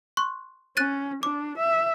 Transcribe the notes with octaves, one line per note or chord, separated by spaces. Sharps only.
C6 C#6 F#6
C#4 F#6 A6 D#7
D4 D6
E5